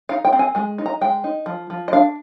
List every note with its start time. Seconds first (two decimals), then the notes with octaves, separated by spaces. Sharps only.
0.09 D#4 F5
0.25 G5
0.33 C4
0.39 G#5
0.55 G#3 G#5
0.78 D#4
0.86 A#5
1.01 G#3 G5
1.24 D#4
1.46 F3
1.70 F3
1.88 D#5
1.93 D4 F5